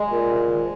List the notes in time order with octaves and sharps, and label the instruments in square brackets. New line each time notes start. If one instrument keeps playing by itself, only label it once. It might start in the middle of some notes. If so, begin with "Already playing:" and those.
Already playing: [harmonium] G#3
[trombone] A#2
[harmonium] C3
C#3
D#3
F3